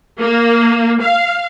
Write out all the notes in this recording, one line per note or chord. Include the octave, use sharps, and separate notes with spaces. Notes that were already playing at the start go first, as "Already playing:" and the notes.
A#3
F5